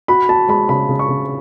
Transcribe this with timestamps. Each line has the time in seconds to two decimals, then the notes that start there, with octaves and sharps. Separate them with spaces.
0.08 F#4 B5
0.29 F#4 A5
0.48 G#3 B5
0.69 C#3 B5
0.89 C#3
0.99 C#6
1.09 C#3